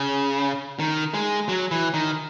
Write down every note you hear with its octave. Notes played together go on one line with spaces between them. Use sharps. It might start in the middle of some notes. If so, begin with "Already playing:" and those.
Already playing: C#3
D#3
G#3
F#3
E3
D#3